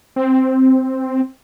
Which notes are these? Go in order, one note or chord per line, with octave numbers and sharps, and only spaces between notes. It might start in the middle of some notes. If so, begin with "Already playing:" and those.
C4